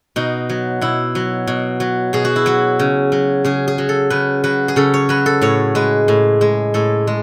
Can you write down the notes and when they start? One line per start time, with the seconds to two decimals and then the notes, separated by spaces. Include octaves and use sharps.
0.16 B2 D#4
0.49 F#3
0.81 B2 E4
1.15 F#3
1.47 B2
1.80 F#3
2.13 B2 G#4
2.25 F#4
2.36 E4
2.46 F#3 F#4
2.79 C#3
3.12 F#3
3.44 C#3 G#4
3.68 G#4
3.78 F#3
3.89 A4
4.10 C#3 B4
4.44 F#3 B4
4.68 G#4
4.76 C#3 A4
4.94 C#5
5.09 F#3 B4
5.26 A4
5.41 A2 C#5
5.75 G#3 B4
6.08 A2
6.41 G#3
6.74 A2 A4
7.07 G#3